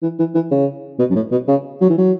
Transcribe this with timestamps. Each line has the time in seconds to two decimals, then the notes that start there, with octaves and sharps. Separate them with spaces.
0.02 E3
0.19 E3
0.34 E3
0.51 C#3
0.99 B2
1.10 F#2
1.15 A2
1.32 B2
1.48 C#3
1.81 F#3
1.90 E3
1.98 F#3